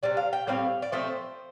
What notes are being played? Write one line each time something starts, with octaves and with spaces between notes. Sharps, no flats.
C3 G3 D4
F5
G5
A2 G3 C4 F5
D5
F3 A3 C4 C5